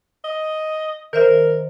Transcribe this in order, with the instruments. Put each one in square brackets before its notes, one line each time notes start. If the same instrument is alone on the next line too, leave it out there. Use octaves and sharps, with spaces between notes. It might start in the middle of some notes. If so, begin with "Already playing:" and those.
[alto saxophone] D#5
[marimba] D#3 C5 E5 [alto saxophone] A#4